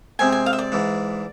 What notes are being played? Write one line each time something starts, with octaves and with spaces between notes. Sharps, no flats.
C3 G#3 C4 G#5
G#5
F5
E5
D5
G#2 E3 G#3